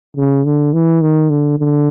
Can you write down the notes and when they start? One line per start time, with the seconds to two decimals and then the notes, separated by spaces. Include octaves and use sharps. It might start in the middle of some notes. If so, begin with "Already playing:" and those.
0.17 C#3
0.46 D3
0.73 E3
1.02 D#3
1.30 D3
1.59 D3